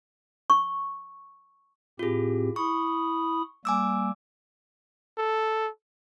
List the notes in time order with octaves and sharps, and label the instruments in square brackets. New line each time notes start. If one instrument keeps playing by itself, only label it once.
[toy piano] C#6
[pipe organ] A2 C4 G4 [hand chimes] F4 G#4
[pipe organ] E4 B5 D#6 [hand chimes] C#6
[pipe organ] G3 A#3 [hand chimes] G#5 D6 E6
[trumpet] A4